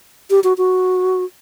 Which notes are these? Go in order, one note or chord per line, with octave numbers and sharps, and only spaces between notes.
G4
F#4
F#4